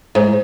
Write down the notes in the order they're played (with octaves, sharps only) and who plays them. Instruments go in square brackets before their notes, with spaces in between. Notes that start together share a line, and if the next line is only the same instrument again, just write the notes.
[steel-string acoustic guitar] G#2